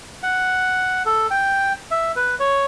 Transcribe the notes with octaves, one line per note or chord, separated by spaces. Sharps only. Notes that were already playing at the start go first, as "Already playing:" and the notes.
F#5
A4
G5
E5
B4
C#5